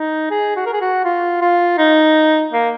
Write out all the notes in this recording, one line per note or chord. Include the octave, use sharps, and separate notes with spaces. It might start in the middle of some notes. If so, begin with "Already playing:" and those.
Already playing: D#4
G#4
F#4
A#4
G#4
F#4
F4
F4
D#4
A#3